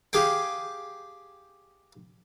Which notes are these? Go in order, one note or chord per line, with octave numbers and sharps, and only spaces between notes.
G4 G#4 F5 G5